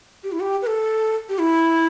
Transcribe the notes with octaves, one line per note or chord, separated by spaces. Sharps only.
G4
E4
G4
B4
A4
G4
E4